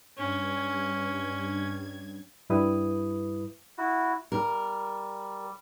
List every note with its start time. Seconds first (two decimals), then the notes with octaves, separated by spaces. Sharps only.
0.17 G2 C#4 G#6
2.50 G2 G3 E4 B4 D#6
3.78 E4 F#4
4.32 G3 A#4